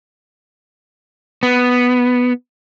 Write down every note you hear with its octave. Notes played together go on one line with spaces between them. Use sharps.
B3